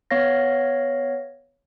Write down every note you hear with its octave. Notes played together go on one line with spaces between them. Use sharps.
B3 C#5 F5 A#6